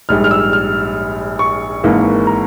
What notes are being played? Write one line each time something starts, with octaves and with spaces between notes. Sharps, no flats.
A#1 G#2 G3 F6
F6
E6
F6
C#6
G#1 G#2 E3 A#3
A#5